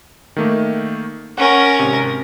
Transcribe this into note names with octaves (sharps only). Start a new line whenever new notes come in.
D#3 A3 A#3
C#4 A#4 F#5
G#1 C3